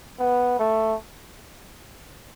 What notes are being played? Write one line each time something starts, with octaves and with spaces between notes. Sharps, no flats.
B3
A3